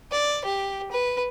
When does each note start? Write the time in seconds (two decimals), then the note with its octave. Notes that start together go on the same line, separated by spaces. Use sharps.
0.11 D5
0.45 G4
0.92 B4